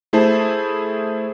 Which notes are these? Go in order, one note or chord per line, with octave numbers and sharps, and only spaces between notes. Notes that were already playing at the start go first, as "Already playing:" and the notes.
A3 E4 G#4 C5 A5